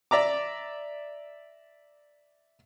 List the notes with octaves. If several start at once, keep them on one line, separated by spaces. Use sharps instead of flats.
D5 E5 A#5 D6